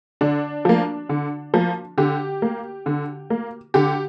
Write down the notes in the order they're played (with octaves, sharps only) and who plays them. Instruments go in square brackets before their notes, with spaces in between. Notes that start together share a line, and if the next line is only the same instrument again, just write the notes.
[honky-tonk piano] D3 D4
F3 A#3
D3
F3 A#3
D3 G4
A#3
D3
A#3
D3 G4